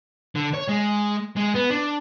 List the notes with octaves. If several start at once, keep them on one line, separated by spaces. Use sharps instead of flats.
D3
C#5
G#3
G#3
B3
D4